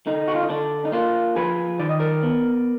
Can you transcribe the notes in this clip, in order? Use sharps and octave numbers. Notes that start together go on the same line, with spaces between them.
D3 D#4
F#4
F4
D#4
D3 D4
D#4
A#3 D4 F4
F3 G#4 B4
D#3 D5
D#5
A#4 D5
B3